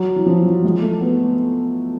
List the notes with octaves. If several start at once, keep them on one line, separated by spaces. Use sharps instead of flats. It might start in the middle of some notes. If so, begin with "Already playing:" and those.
Already playing: F#3
E3
F3
F#3
G#3
A3
B3